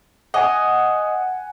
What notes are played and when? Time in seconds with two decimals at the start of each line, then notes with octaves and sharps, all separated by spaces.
0.34 D#5 F#5 G#5